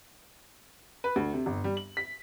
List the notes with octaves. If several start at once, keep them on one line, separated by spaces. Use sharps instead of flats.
B4
D2
C3
G1
G3
F#7
B6